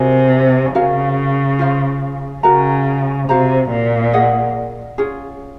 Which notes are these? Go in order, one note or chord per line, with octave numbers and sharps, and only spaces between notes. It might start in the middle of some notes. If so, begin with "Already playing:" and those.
Already playing: C3 F#4 A#4 D#5 G#5
C#3 C#4 F#4 A#4 F5
F4 C5 F5
C#3 F#4 A#4 D#5 A#5
C3 F#4 C5 F5 A#5
A#2
G#4 D#5 F#5
C#4 F4 G#4